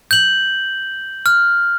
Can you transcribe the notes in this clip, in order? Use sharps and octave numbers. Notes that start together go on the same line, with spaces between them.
G6 F#7
F6